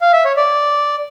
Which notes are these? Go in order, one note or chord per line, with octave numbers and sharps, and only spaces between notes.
F5
E5
C#5
D5